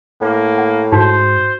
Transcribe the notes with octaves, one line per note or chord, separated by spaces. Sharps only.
A2 A#3
F#5
G#2 D#4 F#4 C5